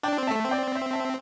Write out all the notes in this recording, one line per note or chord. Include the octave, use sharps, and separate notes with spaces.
D4 D5 G5
C4
A3 E5 A5
C4
D5 G5
C5 E5
E5 A5